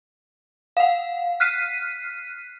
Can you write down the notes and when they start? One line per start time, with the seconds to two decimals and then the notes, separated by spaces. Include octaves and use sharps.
0.77 F5 F#5
1.40 F6 F#6 B6 C7 D#7